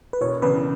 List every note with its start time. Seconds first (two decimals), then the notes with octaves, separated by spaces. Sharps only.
0.13 B4
0.21 E1 C#5
0.42 E2 C#3 B4